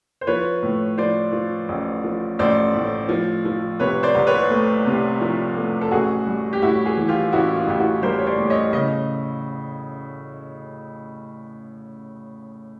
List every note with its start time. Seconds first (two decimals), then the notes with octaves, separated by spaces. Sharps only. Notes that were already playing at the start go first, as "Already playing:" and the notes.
0.21 C5
0.27 F3 B4 C#5
0.62 A2
0.98 F3 C5 D5
1.32 F3
1.69 A1
2.04 F3
2.39 A1 C5 D5
2.74 A2
3.09 F3
3.45 F3
3.80 C3 B4 C#5
4.03 C5 D5
4.15 C2
4.27 B4 C#5
4.50 A3
4.86 C3
5.21 F3
5.56 A3
5.81 A4
5.91 A1 F#4 G#4
6.27 G3
6.53 G4
6.62 A2 E4 F#4
6.85 F#4 G#4
6.97 E3
7.08 F4 G4
7.32 A1 E4 F#4
7.56 F4
7.67 A1 G4
7.79 E4 F#4
8.02 G3 A#4 C5
8.19 C#5
8.27 C5 D5
8.38 A2
8.50 C#5 D#5
8.73 C#3 D#5